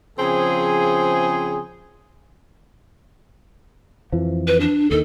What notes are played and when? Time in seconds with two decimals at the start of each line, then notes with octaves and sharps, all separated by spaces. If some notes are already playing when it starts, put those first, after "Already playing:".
0.18 C#3 F3 C4 G#4
4.12 F2 E3 F3
4.47 B4
4.60 D4
4.91 D#2 D#3 A4